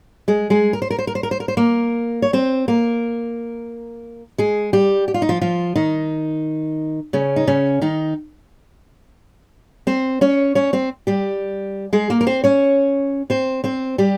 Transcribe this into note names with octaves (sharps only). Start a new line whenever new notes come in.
G#3 G#4
G#3 G#4
A#4
C5
A#4
C5
A#4
C5
A#4
C5
A#4
C5
A#3 A#4
C#5
C4 C5
A#3 A#4
G#3 G#4
G3 G4
G4
F4
D#4
F3 F4
F3 F4
D#3 D#4
C#3 C#4
D#4
C#3 C#4
D#3 D#4
C4 C5
C#4 C#5
C#4 C#5
C4 C5
G3 G4
G#3 G#4
A#3 A#4
A#4
C4 C5
C#4 C#5
C4 C5
C4 C5
G3 G4